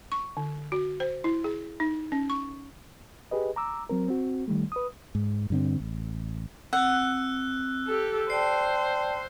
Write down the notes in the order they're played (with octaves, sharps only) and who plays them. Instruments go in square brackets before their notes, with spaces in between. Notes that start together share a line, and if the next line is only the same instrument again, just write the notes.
[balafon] C#6
D3
F#4
C5
E4
G#4
D#4
C#4
C#6
[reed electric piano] G4 G#4 B4 D#5
A#5 D6 E6
F#3 C4 A#4
C4 F#4
D#3 G3 A3
B4 D#6
[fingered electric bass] G#2
G2 D3 C4
A1
[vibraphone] C4 [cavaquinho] F#5 [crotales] E6 F#6
[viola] G4 A4
[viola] C5 [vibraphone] D5 G5 A5 [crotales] C7